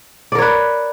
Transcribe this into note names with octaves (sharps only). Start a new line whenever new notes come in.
A#4 B4 C#5 D5